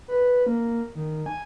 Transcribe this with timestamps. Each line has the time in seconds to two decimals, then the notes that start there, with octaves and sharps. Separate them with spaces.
0.08 B4
0.46 A#3
0.95 D#3
1.26 G#5